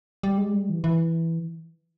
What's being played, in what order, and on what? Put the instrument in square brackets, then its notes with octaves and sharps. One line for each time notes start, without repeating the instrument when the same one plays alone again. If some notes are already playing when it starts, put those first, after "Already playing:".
[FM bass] G3
G#3
G3
E3
E3